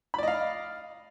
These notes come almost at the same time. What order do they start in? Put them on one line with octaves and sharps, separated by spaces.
B5 D5 D#5 F5